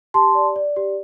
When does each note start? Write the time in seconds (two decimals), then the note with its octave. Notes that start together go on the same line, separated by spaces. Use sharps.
0.14 G4 A5 C6
0.35 D5
0.56 D5
0.76 G4